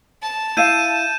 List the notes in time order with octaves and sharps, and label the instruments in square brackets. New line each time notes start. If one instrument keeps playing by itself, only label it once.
[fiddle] A5
[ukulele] E4 F5 [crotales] G6 D#7 E7